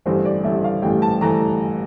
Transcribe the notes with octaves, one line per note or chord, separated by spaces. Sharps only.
A1 G2 E3 A3 C5
D5
A1 G2 E3 A3 E5
F5
A1 G2 E3 A3 G5
A5
E3 A3 A#5